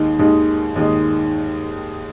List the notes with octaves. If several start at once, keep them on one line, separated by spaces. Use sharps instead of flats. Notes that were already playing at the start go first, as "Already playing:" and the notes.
Already playing: D#2 D#3 G#3 D#4
D#2 D#3 G#3 D#4
D#2 D#3 G#3 D#4